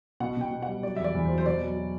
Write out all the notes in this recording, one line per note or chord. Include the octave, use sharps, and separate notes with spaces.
B2 F#5
B2 G5
B2
F#5
G3
F#3 D5
E2 E5
D5
E2
C5
F#3
C5
B2 D5
F#3
F#3